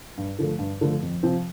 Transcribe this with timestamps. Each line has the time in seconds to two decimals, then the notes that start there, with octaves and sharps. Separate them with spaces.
0.18 G2
0.39 D3 F3 A3
0.59 G2
0.81 D3 F3 A3
1.02 F2
1.23 C3 F3 C4